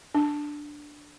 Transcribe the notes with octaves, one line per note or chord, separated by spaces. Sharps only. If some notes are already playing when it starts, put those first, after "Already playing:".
D4